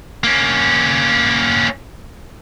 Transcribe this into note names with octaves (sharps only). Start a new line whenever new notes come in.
A#3 C#4